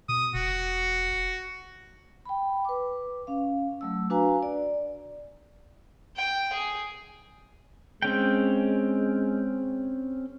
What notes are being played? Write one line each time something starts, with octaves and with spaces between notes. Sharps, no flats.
B2 D#6
E1 F#4
G5 B5
B4 D6
C#4 F5
F#3 A3 E6
D4 F#4 B4 F5 G#5 A#5
D5
G5
G#4
G#3 C4 C#4 G5